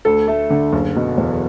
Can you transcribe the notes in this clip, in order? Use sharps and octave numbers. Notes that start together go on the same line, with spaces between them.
D2 A4
A3
D3
F#1
B2
E2